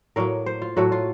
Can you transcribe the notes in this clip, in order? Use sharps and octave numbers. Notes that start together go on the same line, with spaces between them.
A2 F#3 A#3 A#4
C5
F4
A2 F#3 A3 F#4
F4